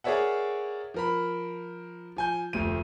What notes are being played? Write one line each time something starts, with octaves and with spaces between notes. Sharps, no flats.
G#4 A#4 C#5 D5 E5 F#5
F3 A#4 B5
F3 G#5 G6
F1 D2 F3 D#7